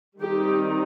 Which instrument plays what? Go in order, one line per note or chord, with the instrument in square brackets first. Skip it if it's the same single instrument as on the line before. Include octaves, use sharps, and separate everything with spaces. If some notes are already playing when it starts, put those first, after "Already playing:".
[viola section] D#3 G3 C4 D#4 G4